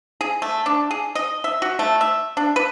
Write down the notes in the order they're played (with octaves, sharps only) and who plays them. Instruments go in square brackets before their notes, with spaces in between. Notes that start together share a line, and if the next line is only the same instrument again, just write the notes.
[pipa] G#4
A3
D4
G#4
D#5
E5
F#4
A3
E5
D4
B4